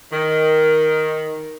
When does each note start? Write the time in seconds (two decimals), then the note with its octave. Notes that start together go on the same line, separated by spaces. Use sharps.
0.12 D#3